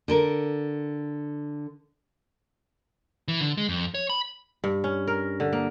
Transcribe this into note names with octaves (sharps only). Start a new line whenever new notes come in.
D3 A4 A#4
E3
D3
G#3
F2
C#5
B5
G2
C#4
A#4
D3
A#3